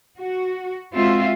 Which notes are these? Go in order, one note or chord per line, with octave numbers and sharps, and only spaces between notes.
F#4
G#3 C4 F4 F#4 E5